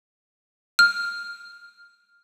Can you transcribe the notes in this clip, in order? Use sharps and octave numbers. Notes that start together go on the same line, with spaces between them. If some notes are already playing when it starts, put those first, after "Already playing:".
F6